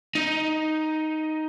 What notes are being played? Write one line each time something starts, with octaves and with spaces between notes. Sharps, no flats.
D#4